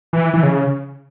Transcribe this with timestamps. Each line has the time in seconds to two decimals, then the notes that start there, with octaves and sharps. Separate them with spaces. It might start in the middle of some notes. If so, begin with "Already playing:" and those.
0.13 E3
0.33 E3
0.43 C#3